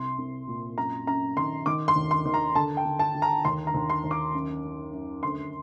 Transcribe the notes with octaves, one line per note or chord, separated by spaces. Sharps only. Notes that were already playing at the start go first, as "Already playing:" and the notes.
Already playing: C2 C6
C2
A#2
F#2 A#5
F#2 A#5
D#3 C6
D#3 D6
C6
D#2
C6
D#3
A#5
D3 A5
G5
D3
A5
D3
A#5
D#2 C6
A#5
D#2
C6
D#2
D6
F#2
F#2
F#2
D2 C6